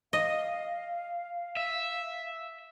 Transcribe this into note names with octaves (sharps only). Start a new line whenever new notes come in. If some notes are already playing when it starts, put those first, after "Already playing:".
D#5 F5
E5